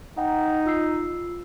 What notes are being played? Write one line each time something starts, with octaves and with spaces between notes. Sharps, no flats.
D#4 F#5 G5 A#5
F4 E6 C7